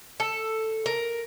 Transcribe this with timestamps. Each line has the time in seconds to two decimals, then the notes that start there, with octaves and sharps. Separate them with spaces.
0.20 A4
0.86 A#4